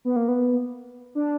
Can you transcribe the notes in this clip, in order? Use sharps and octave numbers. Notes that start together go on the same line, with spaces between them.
B3
A#3
B3
D4